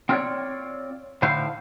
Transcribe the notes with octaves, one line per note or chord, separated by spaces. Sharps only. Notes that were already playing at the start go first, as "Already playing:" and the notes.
C4 F4 A#4 B4 C#5 D5
A2 D3 E4 C5 F5